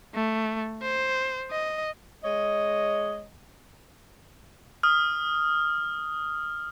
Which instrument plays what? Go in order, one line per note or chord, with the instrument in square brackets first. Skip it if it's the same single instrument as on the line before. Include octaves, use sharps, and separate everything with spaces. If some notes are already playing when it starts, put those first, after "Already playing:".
[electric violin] A3
C5
D#5
[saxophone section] G#3 C#5 D#5
[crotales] D#6 F6